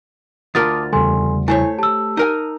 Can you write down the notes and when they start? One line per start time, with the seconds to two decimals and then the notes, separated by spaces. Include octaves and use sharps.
0.55 D2 F4 A#4 A5 D6 D#6 A6
0.93 E2 C#3 G3 A4 G#5 C6
1.48 A3 E4 C5 C#5 G#5
1.79 G4 A5 E6
2.17 D#4 A#4 G#5